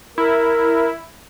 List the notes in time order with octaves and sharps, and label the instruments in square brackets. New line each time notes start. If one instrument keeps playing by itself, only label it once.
[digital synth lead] E4 [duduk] A#4